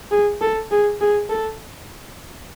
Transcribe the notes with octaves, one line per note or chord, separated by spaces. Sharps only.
G#4
A4
G#4
G#4
A4